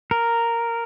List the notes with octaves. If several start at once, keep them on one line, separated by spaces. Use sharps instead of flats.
A#4